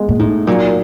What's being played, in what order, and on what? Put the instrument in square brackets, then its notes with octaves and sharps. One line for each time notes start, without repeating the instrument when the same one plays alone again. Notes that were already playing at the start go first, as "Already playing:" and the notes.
Already playing: [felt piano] G#3 B3
[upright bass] A#2
[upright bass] A2 [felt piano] D#4
[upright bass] A#2 [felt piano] F#3